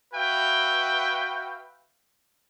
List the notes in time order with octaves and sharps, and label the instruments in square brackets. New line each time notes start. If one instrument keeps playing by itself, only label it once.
[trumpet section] F#4 B4 E5 F5 G5